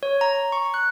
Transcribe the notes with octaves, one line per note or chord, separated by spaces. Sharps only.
C#5
A#5
C#6
F#6